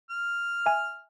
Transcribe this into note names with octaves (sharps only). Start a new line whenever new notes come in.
F6
E5 G#5